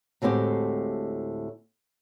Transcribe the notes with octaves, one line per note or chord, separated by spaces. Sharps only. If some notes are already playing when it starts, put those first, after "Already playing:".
D2 A2 G#3 C4 G4